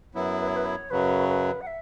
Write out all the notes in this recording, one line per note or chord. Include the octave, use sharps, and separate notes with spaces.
F#2 F#3 B3 E4 B4
B4
C#5
B4
C#5
F#2 C#3 F#3 B4
B4
F#5
E5